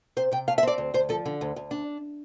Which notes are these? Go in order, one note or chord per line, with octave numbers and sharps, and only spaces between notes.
C3 C5
C3 G5
A3 F5
E5
C4 D5
D2
D2 C5
F3 A4
D3
D2
D2
D4